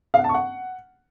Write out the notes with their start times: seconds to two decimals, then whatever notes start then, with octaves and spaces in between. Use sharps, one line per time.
0.14 F5
0.19 F#5
0.24 A5
0.29 C#6
0.34 F#5